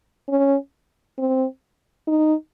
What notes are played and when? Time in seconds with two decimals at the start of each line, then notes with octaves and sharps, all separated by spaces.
0.28 C#4
1.18 C4
2.07 D#4